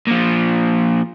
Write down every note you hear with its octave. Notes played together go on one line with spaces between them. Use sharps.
A#2 F3